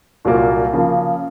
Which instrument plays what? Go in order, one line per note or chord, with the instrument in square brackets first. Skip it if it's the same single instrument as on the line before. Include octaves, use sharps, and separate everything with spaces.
[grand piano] C2 A#2 F#3 A#3 F4
C#3 F3 A#3